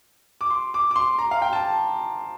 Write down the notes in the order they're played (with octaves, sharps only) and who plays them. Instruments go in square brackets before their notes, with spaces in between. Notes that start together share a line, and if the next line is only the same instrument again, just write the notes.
[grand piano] D6
C6
D6
D6
C6
A#5
F5
G5
A5